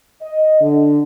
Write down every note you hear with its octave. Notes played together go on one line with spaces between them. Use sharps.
D#5
D3